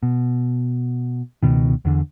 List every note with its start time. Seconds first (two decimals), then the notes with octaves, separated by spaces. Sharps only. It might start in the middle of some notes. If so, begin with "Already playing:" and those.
0.03 B2
1.43 C#2 B2 D#3
1.85 E2 D3